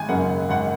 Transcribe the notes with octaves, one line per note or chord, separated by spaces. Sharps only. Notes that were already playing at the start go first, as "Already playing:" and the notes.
Already playing: G#1 G#5
F#2 C#3 A#3 F#5
G#1 F#5